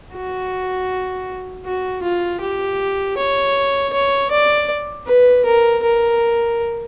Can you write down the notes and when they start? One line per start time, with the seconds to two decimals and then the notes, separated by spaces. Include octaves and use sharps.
0.13 F#4
1.65 F#4
2.02 F4
2.41 G4
3.17 C#5
3.93 C#5
4.31 D5
5.06 B4
5.45 A#4
5.83 A#4